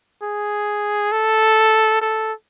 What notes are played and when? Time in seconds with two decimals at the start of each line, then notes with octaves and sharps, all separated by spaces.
0.22 G#4
1.12 A4
2.01 A4